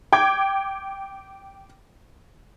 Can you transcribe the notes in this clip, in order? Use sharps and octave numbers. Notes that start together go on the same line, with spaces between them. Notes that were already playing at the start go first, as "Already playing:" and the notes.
G5 D6 G#6